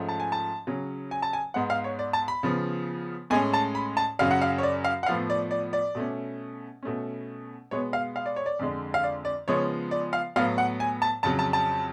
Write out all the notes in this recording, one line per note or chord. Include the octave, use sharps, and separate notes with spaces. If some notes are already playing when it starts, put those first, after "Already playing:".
Already playing: G#2 F3 A3 C#4
A5
G#5
A5
C#3 F#3 C#4
G#5
A5
G#5
G#2 G#3 B3 F#5
F5
C#5
D5
A5
B5
C#3 F3 B3
A2 G#3 C#4 G#5
A5
B5
A5
F#2 C#3 F#3 C#4 F5
F#5
F5
C#5
D5
F5
F#5
A2 F3 B3 F5
D5
D5
D5
B2 A3 C#4
B2 A3 C#4
B2 G#3 B3 C#5
F5
F5
D5
C#5
D5
F2 D3 G#3
F5
D5
D5
C#3 F3 G#3 B3 C#5
D5
F5
A2 F#3 B3 F5
F#5
G#5
A5
F2 C#3 F#3 A5
A5
A5